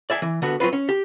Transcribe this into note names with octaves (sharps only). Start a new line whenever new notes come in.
D5 E5 G#5
E3
D3 B3 F#4
F#3 C4 F4 B4
C#4
G4